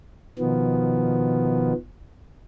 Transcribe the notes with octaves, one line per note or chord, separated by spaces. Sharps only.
B2 D#3 F3 B3